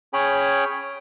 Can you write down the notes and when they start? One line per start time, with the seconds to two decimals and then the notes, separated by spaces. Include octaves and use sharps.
0.13 C#4 G#4 C#5 G5 G#5 B5